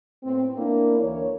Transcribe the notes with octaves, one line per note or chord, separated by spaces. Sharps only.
A2 A3 B3 C4
A#3 D4 E4
D2 E3 A#4 C#5